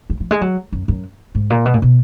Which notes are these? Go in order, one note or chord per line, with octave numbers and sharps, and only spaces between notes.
F3
F3
G#3
F#3
F#2
F#2
G#2
A#2
B2
A#2
B2